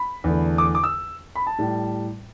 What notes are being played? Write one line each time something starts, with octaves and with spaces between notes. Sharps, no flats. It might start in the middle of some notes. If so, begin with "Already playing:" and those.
Already playing: B5
E2 D3 A3
D6
D6
E6
B5
A5
A2 G3